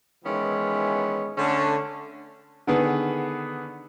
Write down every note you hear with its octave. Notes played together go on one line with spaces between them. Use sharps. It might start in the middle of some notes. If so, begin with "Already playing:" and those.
D#3 E3 G#3 B3 C#4 E4
D3 A3 C#4
D3 D#3 B3 G#4 B4